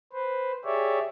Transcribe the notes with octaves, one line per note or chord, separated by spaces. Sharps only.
B4 C5
G4 G#4 C#5 D5 E5